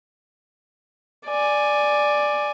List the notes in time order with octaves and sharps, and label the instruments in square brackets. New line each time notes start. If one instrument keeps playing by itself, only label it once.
[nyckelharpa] D5 G#5